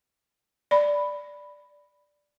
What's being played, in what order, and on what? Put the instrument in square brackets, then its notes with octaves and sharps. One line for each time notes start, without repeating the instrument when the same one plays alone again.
[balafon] D5 B5